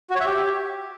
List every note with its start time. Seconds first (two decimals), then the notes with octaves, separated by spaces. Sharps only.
0.10 F#4
0.15 C#5
0.21 E5
0.26 G4